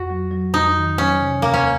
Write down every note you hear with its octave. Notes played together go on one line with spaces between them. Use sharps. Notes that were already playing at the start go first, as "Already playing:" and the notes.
Already playing: F2 F#4
F#3
F#3
F2 D#4
D#3
F#3 C#4
C3
D#2 A#3
C#4